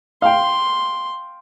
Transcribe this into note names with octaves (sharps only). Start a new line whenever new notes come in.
F5 G5 C6